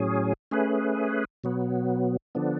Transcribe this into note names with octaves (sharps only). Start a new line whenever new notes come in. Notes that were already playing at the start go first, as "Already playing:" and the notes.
Already playing: A2 F#3 C#4 G#4
A3 C#4 G#4 B4
B2 F#3 B3
D3 F3 B3 D4